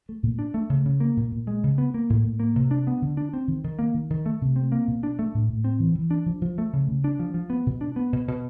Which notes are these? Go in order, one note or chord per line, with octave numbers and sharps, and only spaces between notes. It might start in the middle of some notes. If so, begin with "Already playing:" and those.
A3
A#2
D4
A3
C#3
C#3
A#3
A#2
A#2
G#3
C#3
B3
A#3
A2
A2
A#3
C3
D4
B3
D3
D4
C4
D#3
D#3
A#3
D#3
D#3
A3
C3
C4
A#3
B2
D4
A3
A2
A2
C4
E3
E3
D4
F3
F3
A3
C#3
C#3
D4
F3
F3
B3
B2
D4
B3
B2
B2